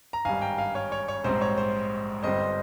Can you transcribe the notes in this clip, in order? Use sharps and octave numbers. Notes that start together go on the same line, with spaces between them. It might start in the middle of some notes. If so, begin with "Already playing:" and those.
A#5
G#1 G2 G3 F5 G#5
G5 A#5
F5 G#5
C#5 F5
C#5
C#5
A#1 G#2 G3 C4 C5
C#5
C5
G1 G2 G3 C4 C5 D#5
C5